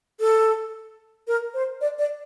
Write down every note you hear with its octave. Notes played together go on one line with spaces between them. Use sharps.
A4
A#4
C5
D5
D5